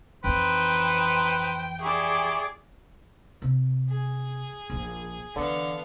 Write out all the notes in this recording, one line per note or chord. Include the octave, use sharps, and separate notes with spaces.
F2 E3 D#4 B4 C5 G5
E4 G4 G#4 D5 C#6
C3
G#4
A#1 F3
D3 E3 B3 F5